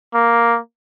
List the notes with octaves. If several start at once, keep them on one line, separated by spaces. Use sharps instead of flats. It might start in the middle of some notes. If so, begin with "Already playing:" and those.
A#3